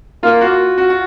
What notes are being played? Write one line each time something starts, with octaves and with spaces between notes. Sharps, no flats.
A#3 F4
F#4
F#4
F#4